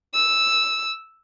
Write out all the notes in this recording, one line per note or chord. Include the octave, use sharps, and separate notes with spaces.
E6